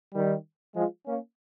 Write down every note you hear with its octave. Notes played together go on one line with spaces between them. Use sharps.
D#3 G3
F3 G#3
A#3 C#4